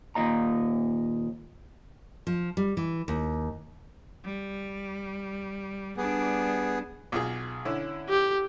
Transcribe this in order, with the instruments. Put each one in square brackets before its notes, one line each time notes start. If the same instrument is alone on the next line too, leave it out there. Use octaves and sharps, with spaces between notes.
[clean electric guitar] D#2 A#2 D#5 A#5
[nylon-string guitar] F3
G3
E3
D#2
[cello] G3
[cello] G3 D4 [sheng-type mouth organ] B3 G#4
[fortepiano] B1 F4 G#4
D3 C#4 E4
[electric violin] G4